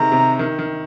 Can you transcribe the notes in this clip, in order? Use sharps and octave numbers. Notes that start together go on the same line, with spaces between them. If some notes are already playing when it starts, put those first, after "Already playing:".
Already playing: C3 D#3 G#3 A#5
C3
D#3
D#3